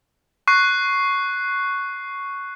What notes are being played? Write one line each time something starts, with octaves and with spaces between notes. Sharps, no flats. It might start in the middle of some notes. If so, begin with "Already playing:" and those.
C#6 F#6 C7